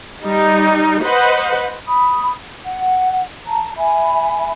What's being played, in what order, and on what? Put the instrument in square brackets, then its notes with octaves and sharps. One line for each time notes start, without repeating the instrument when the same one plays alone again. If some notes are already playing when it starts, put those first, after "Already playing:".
[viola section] G3 D#4 G4
B4 C5 D#5 F#5
[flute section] B5 D#6
F#5
A5 A#5
E5 G#5 B5